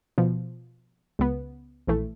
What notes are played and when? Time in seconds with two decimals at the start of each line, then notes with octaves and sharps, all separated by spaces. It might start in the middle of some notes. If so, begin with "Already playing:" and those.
0.18 B2 F3
1.19 C#2 B3
1.87 A#1 E3 A3